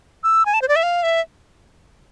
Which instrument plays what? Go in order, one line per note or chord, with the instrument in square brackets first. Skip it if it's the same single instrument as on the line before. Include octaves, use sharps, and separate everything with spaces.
[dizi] E6
G#5
A5
C5
D5
E5
F5
E5